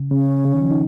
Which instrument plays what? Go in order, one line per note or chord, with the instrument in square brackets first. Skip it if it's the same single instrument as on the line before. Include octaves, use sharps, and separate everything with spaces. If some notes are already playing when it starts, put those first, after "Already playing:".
Already playing: [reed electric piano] C#3
[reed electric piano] C#3 [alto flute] C#4
[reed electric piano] C#3
D#3
F3
D#4